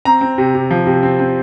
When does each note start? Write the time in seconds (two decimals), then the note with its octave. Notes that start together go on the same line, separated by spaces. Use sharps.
0.05 C4 A#5
0.21 C4
0.38 C3
0.55 C3
0.71 F3
0.87 C3
1.03 C4
1.19 C4